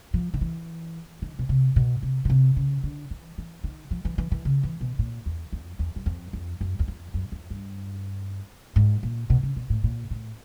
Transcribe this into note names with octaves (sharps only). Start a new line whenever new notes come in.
F3
D#3
E3
D#3
B2
C3
B2
C3
C#3
C3
C#3
D3
E3
E3
D#3
F3
E3
E3
E3
C#3
E3
B2
A#2
E2
F2
E2
F#2
F2
F2
F#2
E2
F2
F#2
F2
G2
G#2
A#2
B2
C#3
B2
A2
A#2
A2